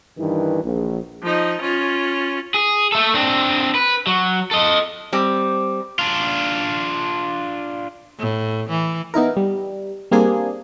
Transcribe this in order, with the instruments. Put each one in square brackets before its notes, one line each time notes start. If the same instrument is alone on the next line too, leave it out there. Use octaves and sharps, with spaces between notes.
[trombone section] G2 D#3 E3
A#1
[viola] F3 D#4
C#4 F4
[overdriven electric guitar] G#4
A3 A4
C4 D4
B4
F#3
A4 D#5
[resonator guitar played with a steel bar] G3 C4
[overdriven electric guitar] D4 F4
[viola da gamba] A2
E3
[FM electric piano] B3 D#4 E4 A#4
G3
G3 A#3 C4 D4 G#4